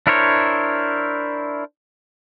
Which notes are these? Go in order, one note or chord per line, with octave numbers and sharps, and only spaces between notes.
D4 E4 A#4 C5 C#5